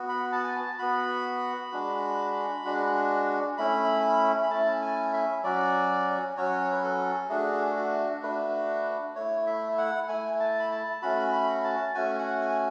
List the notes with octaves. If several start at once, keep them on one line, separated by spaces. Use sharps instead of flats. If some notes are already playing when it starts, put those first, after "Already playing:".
Already playing: B3 F#4
B5
A5
G#5
A5
B3 F#4 B5
G#3 D4 F#4
G#3 D4 F#4
A3 C#4 E4 B5
B5
A3 C#4 E4 A5
G#5
E5
F#3 C#4 F#4 D5
F#3 C#4 F#4 C#5
B4
A4
A3 D4 F#4 G#4
F#4
A3 D4 F#4 B4
A3 E4 C#5
E5
F#5
A3 E4 G#5
A5
B5
A5
A3 C#4 F#4 B5
B5
A5
A3 C#4 F#4 G#5
F#5
G#5